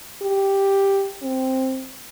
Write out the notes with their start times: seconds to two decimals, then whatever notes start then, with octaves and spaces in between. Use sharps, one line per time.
0.22 G4
1.23 C4